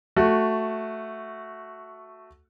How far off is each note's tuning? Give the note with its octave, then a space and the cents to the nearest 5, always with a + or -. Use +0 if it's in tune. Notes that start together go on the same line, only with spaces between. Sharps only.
A3 +0 F#4 +0